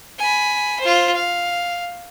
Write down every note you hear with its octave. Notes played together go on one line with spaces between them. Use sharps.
G#5 B5
F4 C5
F5